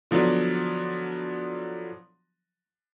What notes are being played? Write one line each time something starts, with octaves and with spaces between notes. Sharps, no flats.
D3 F3 F#3 B3 D4